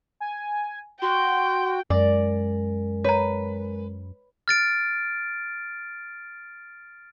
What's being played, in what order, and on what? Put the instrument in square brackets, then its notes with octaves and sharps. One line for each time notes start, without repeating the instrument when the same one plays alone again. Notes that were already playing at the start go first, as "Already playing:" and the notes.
[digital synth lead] G#5
[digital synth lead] F#4 [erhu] G5 [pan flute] C6
[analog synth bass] F#2 [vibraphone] G#3 A#4 [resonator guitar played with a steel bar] D5
[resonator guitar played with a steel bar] B4 [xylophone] C#5 A#5
[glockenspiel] F6 A6 D7